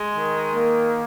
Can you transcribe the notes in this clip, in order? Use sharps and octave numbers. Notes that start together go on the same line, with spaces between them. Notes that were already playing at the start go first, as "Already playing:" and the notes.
Already playing: G#3
D#3
A#3